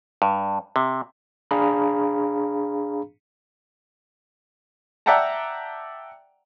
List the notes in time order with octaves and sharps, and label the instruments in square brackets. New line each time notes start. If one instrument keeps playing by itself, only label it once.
[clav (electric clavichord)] G2
C3
[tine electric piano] D4 G#4 F5 A#5 B5
[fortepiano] D5 E5 F#5 G5 A5 A#5